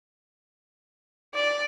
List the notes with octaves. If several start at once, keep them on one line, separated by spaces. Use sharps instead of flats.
D5